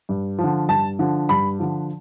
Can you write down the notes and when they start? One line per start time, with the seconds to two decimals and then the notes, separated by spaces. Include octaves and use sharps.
0.09 G2
0.39 F3
0.44 D3
0.69 G2 A5
0.99 D3 F3
1.29 G2 B5
1.59 D3 F3